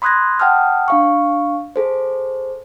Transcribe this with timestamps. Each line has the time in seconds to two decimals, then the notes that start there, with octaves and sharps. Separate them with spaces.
0.02 B5 C6 D#6 F#6 G#6 A#6
0.40 F#5 G5 A5 D#6 F6
0.88 D4 F5 C#6
1.76 G#4 A4 C5